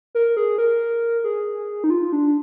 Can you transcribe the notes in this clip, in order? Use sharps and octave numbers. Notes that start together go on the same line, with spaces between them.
A#4
G#4
A#4
G#4
D#4
F4
D4